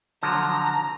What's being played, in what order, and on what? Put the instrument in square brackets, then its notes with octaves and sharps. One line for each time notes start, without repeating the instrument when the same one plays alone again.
[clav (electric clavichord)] D3 F3 F#3 [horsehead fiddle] A#5